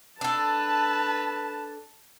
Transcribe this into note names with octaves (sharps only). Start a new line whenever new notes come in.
D4 A4 B4 A5